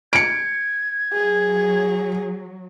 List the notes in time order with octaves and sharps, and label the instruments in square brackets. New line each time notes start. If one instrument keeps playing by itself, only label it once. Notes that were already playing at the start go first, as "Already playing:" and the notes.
[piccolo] G#6 [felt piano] C#7 D7
[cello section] F#3 [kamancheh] G#4